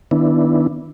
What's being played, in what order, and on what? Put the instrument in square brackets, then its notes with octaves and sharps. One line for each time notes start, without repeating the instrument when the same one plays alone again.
[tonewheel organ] D#3 B3 D4 E4